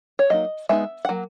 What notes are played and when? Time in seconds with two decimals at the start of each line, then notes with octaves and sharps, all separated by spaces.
0.19 C#5
0.30 F#3 A#3 D#4 D#5
0.69 G#3 B3 D#4 E5
1.05 F#5
1.09 F#3 A#3